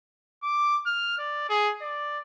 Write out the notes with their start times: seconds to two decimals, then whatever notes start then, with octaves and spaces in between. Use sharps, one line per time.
0.43 D6
0.86 F6
1.18 D5
1.49 G#4
1.82 D5